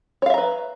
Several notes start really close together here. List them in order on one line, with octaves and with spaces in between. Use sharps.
C#5 F5 E5 A#5 B4